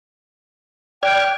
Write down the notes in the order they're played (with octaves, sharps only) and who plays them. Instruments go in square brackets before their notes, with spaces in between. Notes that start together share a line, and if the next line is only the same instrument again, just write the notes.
[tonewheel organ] D5 F6 G#6 [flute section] G5 F#6